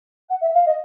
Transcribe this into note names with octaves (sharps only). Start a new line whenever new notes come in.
F#5
E5
F5
D#5